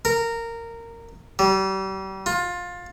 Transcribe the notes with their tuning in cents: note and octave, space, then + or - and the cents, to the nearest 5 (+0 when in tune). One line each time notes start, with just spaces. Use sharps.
A#4 -15
G3 -35
F4 +20